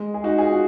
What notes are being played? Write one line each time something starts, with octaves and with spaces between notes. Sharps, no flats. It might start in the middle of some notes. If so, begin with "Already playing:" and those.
Already playing: G#3
G#4
D#4 F#4
F4 G#4
F#4